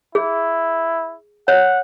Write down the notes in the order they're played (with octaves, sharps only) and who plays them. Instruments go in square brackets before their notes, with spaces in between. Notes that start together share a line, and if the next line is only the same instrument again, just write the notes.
[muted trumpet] E4 [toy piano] G#4
[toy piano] C#5 [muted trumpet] F#5